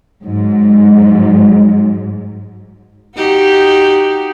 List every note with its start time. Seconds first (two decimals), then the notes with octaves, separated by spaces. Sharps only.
0.23 G#2 F#3
3.16 D#4 F#4 G4